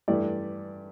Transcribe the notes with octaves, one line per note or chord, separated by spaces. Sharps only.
G2 E3 A3 D5